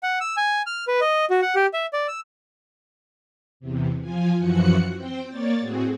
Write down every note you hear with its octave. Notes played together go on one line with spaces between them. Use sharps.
F#5
E6
G#5
F6
B4
D#5
F#4
F#5
G4
E5
D5
E6
E2 C3
F3 F4 G#5
F#2 E3 F3 F#4 F#6 C#7
C4 C5 G5
A#3 C#5 D5 A6
A2 C4 F#4 G#4